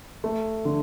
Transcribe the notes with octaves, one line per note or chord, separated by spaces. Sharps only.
A3
D3